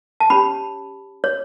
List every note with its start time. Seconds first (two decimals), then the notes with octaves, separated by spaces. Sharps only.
0.20 A5
0.30 C#4 G4 C#5 B5
1.24 C#5